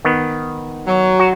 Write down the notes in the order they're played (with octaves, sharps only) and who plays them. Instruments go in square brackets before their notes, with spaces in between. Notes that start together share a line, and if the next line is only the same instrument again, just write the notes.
[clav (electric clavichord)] D#3 B3
[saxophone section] F#3
[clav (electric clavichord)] F#4